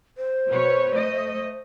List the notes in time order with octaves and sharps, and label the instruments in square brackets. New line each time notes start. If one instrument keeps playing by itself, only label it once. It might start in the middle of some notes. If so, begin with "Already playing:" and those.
[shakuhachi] C5
[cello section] B2 B4 C#5
A3 D#5